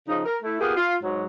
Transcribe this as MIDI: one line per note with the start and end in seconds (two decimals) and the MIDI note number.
0.08 0.23 49
0.08 0.23 53
0.08 0.23 63
0.26 0.36 70
0.43 0.56 57
0.43 0.56 64
0.60 0.75 58
0.60 0.75 59
0.60 0.75 65
0.60 0.75 67
0.60 0.75 68
0.76 0.95 65
1.02 1.24 44
1.02 1.24 54